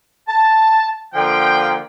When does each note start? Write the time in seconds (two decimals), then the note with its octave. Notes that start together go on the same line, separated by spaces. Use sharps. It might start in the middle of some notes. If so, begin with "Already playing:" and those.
0.28 A5
1.14 D3 F3 A#3 F4 G5